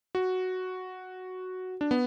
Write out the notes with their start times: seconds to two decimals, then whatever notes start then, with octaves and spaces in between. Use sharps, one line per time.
0.15 F#4
1.81 D4
1.91 B3